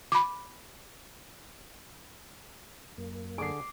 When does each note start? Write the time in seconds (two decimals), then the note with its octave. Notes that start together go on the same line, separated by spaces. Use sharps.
0.12 B5 D6
2.98 F#2 A#3
3.38 D3 G#4 D6 C7